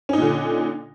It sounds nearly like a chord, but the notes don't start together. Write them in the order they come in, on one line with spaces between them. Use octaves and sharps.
C#4 D#4 A#2 D3